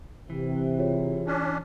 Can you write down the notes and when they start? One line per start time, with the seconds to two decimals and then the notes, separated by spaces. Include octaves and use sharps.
0.30 C3 E3
0.78 F4 G#4 C#5
1.27 C#4 D4